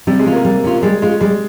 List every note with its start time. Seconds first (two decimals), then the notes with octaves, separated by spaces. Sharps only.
0.07 C3 G3
0.19 G#3
0.26 C#4 F4
0.33 A#3
0.45 G3
0.64 C#4 F4
0.83 G3 G#3
1.02 G#3 C#4 F4
1.21 G3 G#3